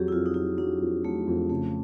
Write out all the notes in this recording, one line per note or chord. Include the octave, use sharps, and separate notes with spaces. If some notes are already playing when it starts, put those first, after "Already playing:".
Already playing: F2 F#3 G4 G#4
E4
F2 F4
D#4
F#3 E4
F#3 D4
F2
F#3 A3
F2
C#3 A3